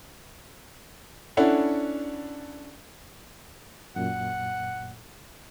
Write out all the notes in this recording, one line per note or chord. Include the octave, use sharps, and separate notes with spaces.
C#4 D4 E4 A4 F#5
F#2 A#2 F#5